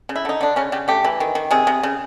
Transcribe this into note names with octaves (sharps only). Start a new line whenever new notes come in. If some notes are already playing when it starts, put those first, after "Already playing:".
C#3
E4
D3 D#4
D3 D4
C#3 C#4
C#3 G4
A3 G4
E3
D#3
D#3
C3 G#4
C3
C#3